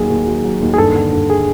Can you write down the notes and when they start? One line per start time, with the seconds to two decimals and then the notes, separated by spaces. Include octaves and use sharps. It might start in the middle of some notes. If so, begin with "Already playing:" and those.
Already playing: D#2 F#3 G#4
0.10 D#2
0.27 F#3
0.44 F#3
0.62 D#2
0.74 G#4
0.78 G2 A4
0.95 D3
1.13 G2
1.30 G#4